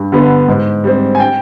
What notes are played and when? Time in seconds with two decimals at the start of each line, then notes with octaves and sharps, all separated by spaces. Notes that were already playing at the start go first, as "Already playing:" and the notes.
Already playing: G2
0.12 D3 G3 B3
0.48 G#2
0.84 G3 C4
1.15 G#5
1.20 G5